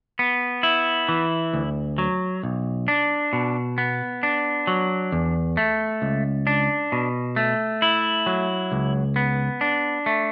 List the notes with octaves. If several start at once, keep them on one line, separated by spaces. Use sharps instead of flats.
B3
E4
E3
D2
F#3
B1
D4
B2
B3
D4
F#3
E2
A3
C#2
D4
B2
A3
E4
F#3
C#2
B3
D4
A3